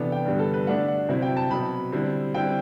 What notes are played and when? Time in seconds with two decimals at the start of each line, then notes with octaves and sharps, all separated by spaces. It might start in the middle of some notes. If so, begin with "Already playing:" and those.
Already playing: C3 E3 B3 D4 A4
0.12 G5
0.26 G2 D3 G3 B3
0.39 A4
0.54 B4
0.67 D3 A3 D4 F#5
0.88 F#5
1.09 C3 F#3 C4 E4
1.22 G5
1.37 A5
1.50 B2 F#3 C4 B5
1.92 D3 G3 C4 E4
2.34 D3 G3 C4 E4 G5